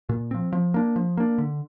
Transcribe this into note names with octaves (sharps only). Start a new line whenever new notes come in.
A#2
F3 C4
F3
A#3 D4
F3
A#3 D4
D3